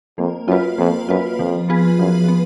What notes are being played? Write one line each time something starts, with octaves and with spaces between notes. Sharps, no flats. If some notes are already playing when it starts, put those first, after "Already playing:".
F2 A#3
F#2 F4 B4
F2 A#3
F#2 F4 B4
F2 F3
B3 F4 G#4 B4
F#2 F3
B3